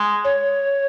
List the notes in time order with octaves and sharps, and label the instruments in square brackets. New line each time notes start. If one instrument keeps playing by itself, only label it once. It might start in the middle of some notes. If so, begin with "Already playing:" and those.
Already playing: [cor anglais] G#3
[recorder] C#5